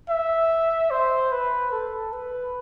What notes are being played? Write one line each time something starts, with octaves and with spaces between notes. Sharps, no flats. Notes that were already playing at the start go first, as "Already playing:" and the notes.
E5
C5
B4
A4
B4